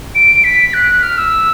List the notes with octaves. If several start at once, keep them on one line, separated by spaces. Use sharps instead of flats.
D7
B6
F#6
F6
E6